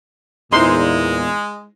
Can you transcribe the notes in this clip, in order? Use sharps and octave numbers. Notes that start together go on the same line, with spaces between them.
E2 A#2 G#3 D#4 E4 C5 C6